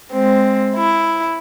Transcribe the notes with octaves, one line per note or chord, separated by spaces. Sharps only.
G#3 C4
E4